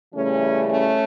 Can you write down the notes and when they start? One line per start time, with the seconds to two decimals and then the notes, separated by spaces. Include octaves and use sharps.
0.13 C#3 E3 G3 A3 C#4
0.68 A3 C#4